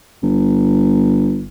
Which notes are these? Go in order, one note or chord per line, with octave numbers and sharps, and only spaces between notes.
G1